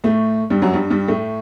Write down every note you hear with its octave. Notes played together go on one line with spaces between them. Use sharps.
A2 A3
G2 G3
F#2 F#3
G2 G3
G2 G3
A2 A3